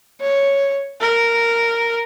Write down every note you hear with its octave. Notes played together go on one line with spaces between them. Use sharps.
C#5
A#4